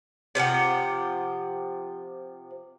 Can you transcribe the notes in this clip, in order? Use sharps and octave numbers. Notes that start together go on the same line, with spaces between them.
C3 F3 G4 F#5